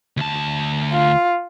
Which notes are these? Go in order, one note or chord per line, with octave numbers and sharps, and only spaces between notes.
D2 A5
F4